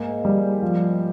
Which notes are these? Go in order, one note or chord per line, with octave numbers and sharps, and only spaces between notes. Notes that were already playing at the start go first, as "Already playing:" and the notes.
Already playing: G#2 A#3
G3
F3